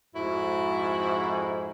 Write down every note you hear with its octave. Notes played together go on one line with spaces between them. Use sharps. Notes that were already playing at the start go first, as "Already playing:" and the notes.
F2 G#2 E4 F#4